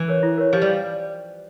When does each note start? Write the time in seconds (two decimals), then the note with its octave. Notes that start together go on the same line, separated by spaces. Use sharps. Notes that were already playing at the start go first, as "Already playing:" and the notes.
Already playing: E3
0.08 A#4 C#5
0.23 E4
0.38 A#4 C#5
0.53 F3 G4
0.62 G3